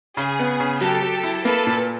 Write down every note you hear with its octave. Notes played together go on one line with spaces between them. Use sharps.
C#3 G#4
B3
C#3
F#3 G4 A4
F#3
E4
A#3 A4 B4
A#2